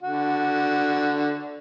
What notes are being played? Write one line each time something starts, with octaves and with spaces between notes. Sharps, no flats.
D3 F#4